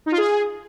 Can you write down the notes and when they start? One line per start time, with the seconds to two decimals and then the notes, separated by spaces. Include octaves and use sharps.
0.06 D#4
0.12 F4
0.18 G#4